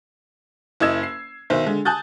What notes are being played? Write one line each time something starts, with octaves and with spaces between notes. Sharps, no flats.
F#1 E4 D#5 E6 G#6 E7
C7
B1 D#3 C5 E5
D3 G#3
G#5 A5 D#6 F#6 G6 A6